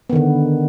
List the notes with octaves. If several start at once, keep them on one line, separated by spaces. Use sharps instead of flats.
D3 D#3 B3